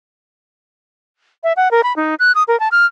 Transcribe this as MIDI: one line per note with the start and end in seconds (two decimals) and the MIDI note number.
1.44 1.53 76
1.57 1.71 78
1.71 1.81 70
1.83 1.95 83
1.96 2.15 63
2.19 2.32 90
2.35 2.43 87
2.48 2.58 70
2.60 2.68 81
2.72 2.86 89